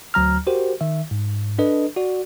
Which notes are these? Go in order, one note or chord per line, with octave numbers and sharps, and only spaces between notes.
D2 F#3 A#5 F6
F#4 G4 A#4 C5
D#3 E5
G#2
D4 A4 B4 D#5
F#4 D5